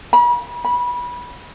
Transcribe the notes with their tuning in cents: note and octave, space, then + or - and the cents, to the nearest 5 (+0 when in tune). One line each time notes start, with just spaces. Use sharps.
B5 -40
B5 -20